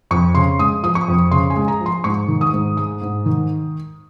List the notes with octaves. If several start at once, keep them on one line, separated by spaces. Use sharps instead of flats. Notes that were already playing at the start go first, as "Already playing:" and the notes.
F2 C#6
C#3 C6
G#3 D#6
F3 D#6
C#6
F2
C#3 C6
G#5
G#3
A#5
F3
C6
G#2 C#6
D#3
D#6
G#2
G#3 D#6
G#2
D#3